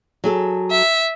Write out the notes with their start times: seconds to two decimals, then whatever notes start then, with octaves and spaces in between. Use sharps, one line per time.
0.24 F#3 G#4 A4
0.71 E5